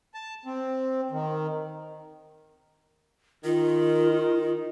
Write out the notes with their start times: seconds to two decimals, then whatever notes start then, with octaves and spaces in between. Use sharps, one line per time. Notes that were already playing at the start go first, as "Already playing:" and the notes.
0.14 A5
0.46 C4
1.11 D#3
3.45 D#3 F4